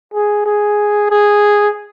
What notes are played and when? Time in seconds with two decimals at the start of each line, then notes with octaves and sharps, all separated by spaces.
0.14 G#4
0.46 G#4
1.10 G#4